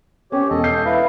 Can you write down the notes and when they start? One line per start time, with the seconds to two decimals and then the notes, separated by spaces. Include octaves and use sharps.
0.32 C#4 G4 C#5
0.50 E1 A4 D#5
0.64 G6 C7
0.86 E4 B4 F5